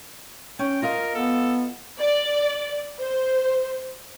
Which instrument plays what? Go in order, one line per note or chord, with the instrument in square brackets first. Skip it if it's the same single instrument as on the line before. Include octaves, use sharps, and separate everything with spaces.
[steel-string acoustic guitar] C#4 [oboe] G5
[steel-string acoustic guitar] F4 D#5 F5 [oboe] A#4
[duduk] B3 [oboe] A4
[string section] D5
C5